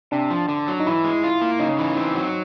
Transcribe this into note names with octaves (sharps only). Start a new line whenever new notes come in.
C3 D4
F3
D3
F#3
D#4
E3 E4
G#3
F4
A#3
C#3 D#4
E3
C4
F#3